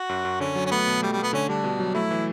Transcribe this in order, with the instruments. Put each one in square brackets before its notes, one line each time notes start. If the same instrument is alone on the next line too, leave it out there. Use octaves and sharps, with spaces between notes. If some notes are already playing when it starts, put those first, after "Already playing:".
Already playing: [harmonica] F#4
[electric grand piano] F#2
F#2
[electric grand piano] D3 [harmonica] C#4
[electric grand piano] F#3
[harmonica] C#4
[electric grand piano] A3 [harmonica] B3
[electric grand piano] B2
[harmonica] G3 [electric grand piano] A3
[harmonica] G3
[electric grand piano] A3 [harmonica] B3
[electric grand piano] D3 [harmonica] C#4
[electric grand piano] G3 [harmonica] D4
[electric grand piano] B2
F#3
[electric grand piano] A3 [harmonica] E4
[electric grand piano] E3